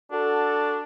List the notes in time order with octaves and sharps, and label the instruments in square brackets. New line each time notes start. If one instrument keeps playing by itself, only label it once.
[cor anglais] D4 [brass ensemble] F#4 A4